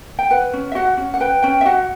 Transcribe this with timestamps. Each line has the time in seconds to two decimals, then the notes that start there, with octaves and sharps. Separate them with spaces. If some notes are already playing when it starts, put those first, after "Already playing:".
0.19 G5
0.31 B4 F#5
0.53 C#4
0.72 E5
0.75 F#4 F#5
0.97 C#4
1.14 F#5
1.20 B4 G5
1.42 C#4 G5
1.61 E5
1.65 F#4 F#5